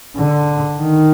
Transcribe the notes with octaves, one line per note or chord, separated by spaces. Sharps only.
D3
D#3